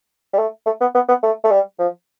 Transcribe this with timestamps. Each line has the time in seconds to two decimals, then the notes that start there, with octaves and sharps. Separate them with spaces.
0.33 G3
0.38 A3
0.66 A3
0.81 B3
0.95 B3
1.08 B3
1.23 A3
1.44 A3
1.51 G3
1.79 F3